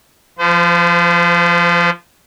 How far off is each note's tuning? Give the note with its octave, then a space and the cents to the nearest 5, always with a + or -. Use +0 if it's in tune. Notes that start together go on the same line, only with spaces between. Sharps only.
F3 -15 C5 -40